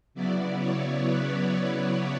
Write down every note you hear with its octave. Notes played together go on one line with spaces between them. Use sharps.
C#3 F#3 B3 E4 D5
C#5
B4
B4